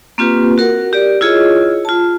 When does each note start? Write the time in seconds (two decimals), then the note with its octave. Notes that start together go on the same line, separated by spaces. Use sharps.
0.18 A#3 C4 F4 G4 B4
0.58 F#4 A#4 F#5
0.93 G4 A#4 D5
1.21 E4 F4 G#4 C#5 D#5
1.85 F4 A5